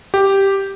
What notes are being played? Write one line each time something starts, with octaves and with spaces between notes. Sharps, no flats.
G4